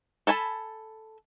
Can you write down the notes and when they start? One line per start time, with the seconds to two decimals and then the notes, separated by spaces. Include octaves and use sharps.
0.27 A4 G#5 A5 B5